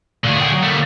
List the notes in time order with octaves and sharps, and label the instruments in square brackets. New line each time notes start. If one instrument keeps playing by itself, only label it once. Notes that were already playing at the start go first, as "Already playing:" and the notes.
[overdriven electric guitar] A#2 A3 [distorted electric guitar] D3 G#4
[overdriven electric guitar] F#5 G5
F#3
[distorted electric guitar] D3 A3 [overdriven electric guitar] G3 A#3